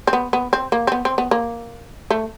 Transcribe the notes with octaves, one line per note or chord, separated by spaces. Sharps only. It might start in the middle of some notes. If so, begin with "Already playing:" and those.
C4
B3
B3
C4
A#3
C4
B3
C4
B3
A#3
A3